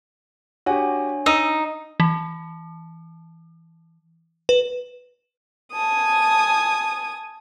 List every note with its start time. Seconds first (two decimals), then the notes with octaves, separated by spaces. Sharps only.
0.66 D4 F#4 G4 C#5 G#5
1.26 D#4 E6
2.00 E3
4.49 B4
5.73 G#5 A5 D#6